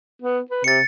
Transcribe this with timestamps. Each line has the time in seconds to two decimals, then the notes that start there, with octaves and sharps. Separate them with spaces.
0.22 B3
0.50 B4
0.64 C3 A6 C#7